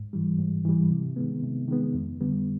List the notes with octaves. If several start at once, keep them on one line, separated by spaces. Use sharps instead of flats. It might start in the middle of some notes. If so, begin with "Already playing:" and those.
Already playing: G#2
E3 G3
G#2
E3 G3
C3
D#3 G#3 B3
C3
D#3 G#3 B3
F2
D3 G3 B3